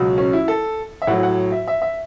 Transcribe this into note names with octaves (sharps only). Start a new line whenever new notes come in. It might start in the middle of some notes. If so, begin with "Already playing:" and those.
Already playing: C#2 B2 F#3
C#4
E4
A4
E5
A2 F#3 F#5
F#5
E5
E5
E5